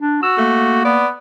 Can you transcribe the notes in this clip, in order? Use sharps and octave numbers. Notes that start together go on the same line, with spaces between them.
D4
F#4 E6
A3 A#3
B3 D5